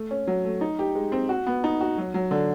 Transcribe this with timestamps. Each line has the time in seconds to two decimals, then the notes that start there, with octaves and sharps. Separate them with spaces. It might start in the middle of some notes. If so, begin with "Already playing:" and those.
Already playing: A3
0.11 C#4
0.27 F#3
0.44 A3
0.61 D#4
0.79 G4
0.95 G#3
1.12 C4
1.29 F#4
1.47 B3
1.64 D#4
1.81 F#4
1.98 F#3
2.14 F#3
2.31 D3